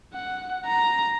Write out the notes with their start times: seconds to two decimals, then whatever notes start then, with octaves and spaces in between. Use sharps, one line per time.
0.14 F#5
0.66 A#5